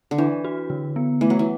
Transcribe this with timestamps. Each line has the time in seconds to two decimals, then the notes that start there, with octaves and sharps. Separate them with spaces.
0.11 D3
0.18 E3 D4
0.45 F#4
0.70 D3
0.96 B3
1.21 E3 A3
1.30 F#3
1.39 E3